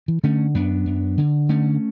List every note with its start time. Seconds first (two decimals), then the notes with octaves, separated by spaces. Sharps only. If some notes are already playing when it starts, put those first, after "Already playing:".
0.08 E3
0.23 D3 A3 C#4
0.55 F#2 B3 D4
0.86 F#2
1.18 D3
1.49 D3 A3 C#4